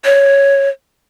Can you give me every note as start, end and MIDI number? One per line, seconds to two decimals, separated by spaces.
0.05 0.69 73